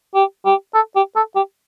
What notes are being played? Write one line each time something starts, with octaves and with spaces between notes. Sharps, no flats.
G4
G4
A4
G4
A4
G4